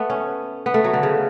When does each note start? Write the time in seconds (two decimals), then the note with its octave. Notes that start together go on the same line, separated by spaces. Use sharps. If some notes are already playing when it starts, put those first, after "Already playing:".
Already playing: A3 B3
0.10 C#4
0.66 B3
0.74 A3
0.84 F#3
0.93 D3
1.03 C#3